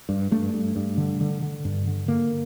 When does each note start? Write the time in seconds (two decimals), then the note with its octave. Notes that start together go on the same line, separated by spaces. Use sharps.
0.09 G2
0.31 G2 A3
0.53 G2
0.76 G2
0.97 D3
1.21 D3
1.42 D3
1.65 G2
1.87 D3
2.08 D3 A#3